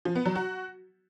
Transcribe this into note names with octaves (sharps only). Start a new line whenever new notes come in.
F3
B3
F#3
F#4